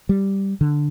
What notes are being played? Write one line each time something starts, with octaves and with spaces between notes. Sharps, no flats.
G3
D3